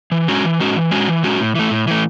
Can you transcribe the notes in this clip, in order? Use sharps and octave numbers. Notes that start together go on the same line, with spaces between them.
E3
G#3 C#4 F#4
E3
G#3 C#4 F#4
E3
G#3 C#4 F#4
E3
G#3 C#4 F#4
A2
E3 A3
A2
E3 A3